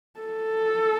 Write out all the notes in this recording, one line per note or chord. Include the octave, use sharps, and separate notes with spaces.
A4